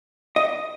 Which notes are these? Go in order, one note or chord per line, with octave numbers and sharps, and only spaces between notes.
D#5